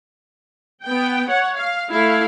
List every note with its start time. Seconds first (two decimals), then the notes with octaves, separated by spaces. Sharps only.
0.84 B3 G5
1.29 C#5 F#5
1.57 F5
1.91 A3 E4 F5